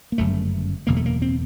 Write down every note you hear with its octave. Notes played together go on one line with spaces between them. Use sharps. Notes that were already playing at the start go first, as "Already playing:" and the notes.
A#3
G1 F#2 C#3 A3
F#1 E2 B2 A#3
A3
A#3
C4